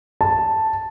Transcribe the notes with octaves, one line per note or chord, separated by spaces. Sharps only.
A5